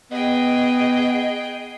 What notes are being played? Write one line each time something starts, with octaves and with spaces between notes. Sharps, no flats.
B3 G#4 D#5 G5